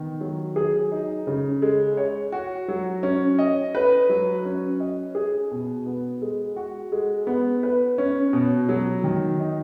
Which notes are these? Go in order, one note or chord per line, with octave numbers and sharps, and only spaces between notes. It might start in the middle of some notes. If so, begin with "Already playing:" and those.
Already playing: D#3 B3
F#3
G#4
D#4
C#3
G#3
C#5
F#4
F#3
C#4
D#5
B4
F#3
C#4
D#5
G#4
B2
B3
G#3
F#4
G#3
B3
B4
C#4
B2
F#3
D#3
D#4